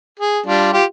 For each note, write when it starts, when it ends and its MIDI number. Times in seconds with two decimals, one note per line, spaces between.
0.20 0.39 68
0.46 0.73 55
0.46 0.73 62
0.46 0.73 65
0.73 0.84 65
0.73 0.84 67